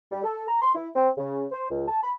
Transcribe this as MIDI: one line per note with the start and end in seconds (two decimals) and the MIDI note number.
0.12 0.21 55
0.24 0.45 69
0.48 0.61 82
0.62 0.73 84
0.75 0.90 64
0.95 1.10 60
1.18 1.45 49
1.52 1.69 72
1.71 1.88 37
1.88 2.02 81
2.03 2.12 83